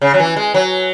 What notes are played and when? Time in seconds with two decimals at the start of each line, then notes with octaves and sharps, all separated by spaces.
0.02 C#3
0.14 F#3
0.20 E3
0.36 G#3
0.54 F#3